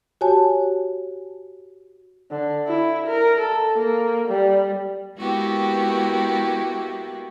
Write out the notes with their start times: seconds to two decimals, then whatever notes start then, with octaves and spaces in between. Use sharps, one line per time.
0.21 F#4 G4 C#5 G#5 A5
2.31 D3
2.67 E4
3.07 A#4
3.40 A4
3.78 A#3
4.29 G3
5.17 G#3 A#3 B3 E4 F#4 G4